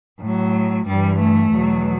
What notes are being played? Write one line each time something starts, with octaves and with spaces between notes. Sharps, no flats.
A2
F#3
G2 E3 G3
A3
E2 B2 F#3